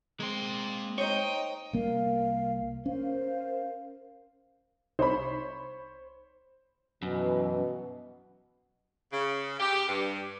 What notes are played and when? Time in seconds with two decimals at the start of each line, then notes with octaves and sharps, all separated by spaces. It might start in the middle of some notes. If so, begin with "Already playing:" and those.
0.20 G#3 A#3 C4 C6
0.98 D#4 C5 C#5 D#5 G5
1.73 C2 A#3 A#4 F5
2.86 C#4 A#4 C5 F5
4.99 C2 D#4 C5 C#5 B5
7.03 F#2 B2 E3
9.12 C#3
9.59 G4
9.89 G2